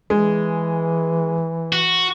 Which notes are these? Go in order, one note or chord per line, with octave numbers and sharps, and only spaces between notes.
E3 G#3
F#4